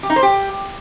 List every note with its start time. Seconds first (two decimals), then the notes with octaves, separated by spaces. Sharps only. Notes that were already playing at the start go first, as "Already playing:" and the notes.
0.03 G4
0.10 D#4
0.16 C5
0.23 G4